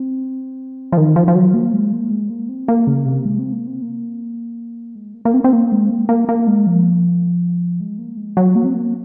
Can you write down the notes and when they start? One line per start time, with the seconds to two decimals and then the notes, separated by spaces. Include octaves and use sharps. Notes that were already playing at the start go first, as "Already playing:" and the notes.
Already playing: C4
0.92 F3
0.97 D#3
1.16 F3
1.28 F3
1.35 F#3
1.54 A#3
1.73 G#3
1.93 A#3
2.11 G#3
2.30 A#3
2.49 C4
2.68 A#3
2.87 C#3
3.05 C3
3.25 G#3
3.39 C4
3.53 A#3
3.67 C4
3.82 A#3
4.95 G#3
5.14 A#3
5.25 A#3
5.34 C4
5.44 C4
5.53 A#3
5.72 G#3
5.90 A#3
6.09 A#3
6.29 A#3
6.47 G#3
6.67 F3
7.80 G#3
7.98 A#3
8.17 G#3
8.37 F#3
8.55 A#3
8.65 C4
8.74 A#3